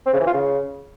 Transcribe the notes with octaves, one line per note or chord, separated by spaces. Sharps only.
C4
C#3
E3
F4
C#3